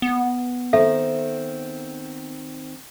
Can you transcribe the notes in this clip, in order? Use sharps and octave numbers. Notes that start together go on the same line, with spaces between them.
B3
D#3 C4 A4 E5